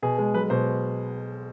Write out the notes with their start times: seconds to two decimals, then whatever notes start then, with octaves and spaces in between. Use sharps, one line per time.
0.02 B2 G#4
0.18 G#3
0.34 B1 B4
0.50 B2 C5